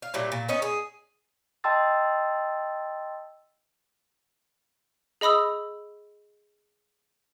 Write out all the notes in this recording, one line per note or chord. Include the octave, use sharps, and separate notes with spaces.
F5
A#2 F#3 G3 E4
A#2
B3 C#4 D#4
G#4
D#5 G5 A5 C6 E6 A6
G#4 D#5 B5 D#6 E6